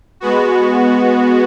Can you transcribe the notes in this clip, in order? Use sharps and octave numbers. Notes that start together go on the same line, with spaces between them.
G#3 B3 F#4